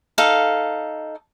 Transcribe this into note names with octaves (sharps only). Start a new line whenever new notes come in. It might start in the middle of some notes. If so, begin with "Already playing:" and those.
D#4 A4 F5